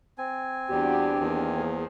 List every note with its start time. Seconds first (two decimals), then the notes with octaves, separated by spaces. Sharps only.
0.18 C4 G#5
0.70 E2 G3 B3 D4 F#4 G4
1.19 E2 D#3 A#3
1.55 G#4 C5